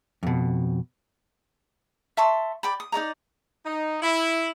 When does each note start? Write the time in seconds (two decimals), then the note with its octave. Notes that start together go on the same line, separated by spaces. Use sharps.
0.23 F2 B2
2.17 E5 A5 C6 C#6
2.63 D5 G5 B5
2.80 D#6
2.92 D#4 D5 D#5 A#5
3.65 D#4
4.02 E4